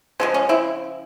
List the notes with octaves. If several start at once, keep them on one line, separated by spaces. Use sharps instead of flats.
C#3 F3 G#3 C4
C#4
C4 E4